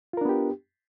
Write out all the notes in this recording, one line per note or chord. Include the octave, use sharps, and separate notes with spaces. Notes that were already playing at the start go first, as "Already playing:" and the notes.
B3 D4 F4 G4 A#4